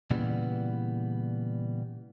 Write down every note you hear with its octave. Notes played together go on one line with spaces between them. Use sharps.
A#2 C#3 E3 G3 B3